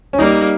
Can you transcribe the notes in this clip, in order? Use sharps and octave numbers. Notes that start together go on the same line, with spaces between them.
C#4
G3 A#3 D#4